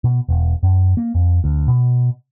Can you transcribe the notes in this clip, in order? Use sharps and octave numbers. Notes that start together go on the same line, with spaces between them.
B2
E1
F#2
A#3
F2
D2
B2